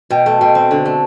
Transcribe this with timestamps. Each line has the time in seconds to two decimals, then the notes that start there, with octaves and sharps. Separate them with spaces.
0.10 B2 G5
0.26 A3
0.41 B2 G5
0.55 C4
0.71 D3
0.85 A3